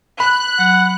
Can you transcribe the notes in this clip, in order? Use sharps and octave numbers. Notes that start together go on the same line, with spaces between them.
B5 F#6
F#3 F#5